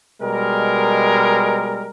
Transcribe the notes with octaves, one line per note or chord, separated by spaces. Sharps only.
B2 G3 G#3 A#4